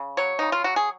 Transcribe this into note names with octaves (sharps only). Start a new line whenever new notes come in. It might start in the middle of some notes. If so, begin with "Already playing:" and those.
Already playing: C#3
F#3 C#5
C#3 D#4
F4
F#3 F#4
G#4